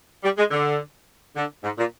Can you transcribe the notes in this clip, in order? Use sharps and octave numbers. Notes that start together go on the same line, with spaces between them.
G3
G#3
D3
D3
G#2
A#2